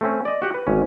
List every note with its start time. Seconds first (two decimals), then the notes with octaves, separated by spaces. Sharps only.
0.01 A3 C4 C#4
0.25 D5 D#5
0.42 F#4 G4 F#5
0.54 B4
0.67 G#1 C#4